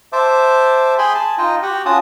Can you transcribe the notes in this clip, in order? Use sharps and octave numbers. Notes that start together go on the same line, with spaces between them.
C5 E5 A5 D6
G#4 G5 G#5 B5 C6
G#5 A5
D#4 F4 D#5 G5
F#4 G4 F#5 G5
C#4 F4 F#4 A5 D#6